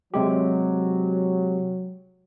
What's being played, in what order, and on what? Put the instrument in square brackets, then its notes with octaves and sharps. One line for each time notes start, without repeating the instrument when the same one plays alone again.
[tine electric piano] C3 G#3 G4 [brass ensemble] F#3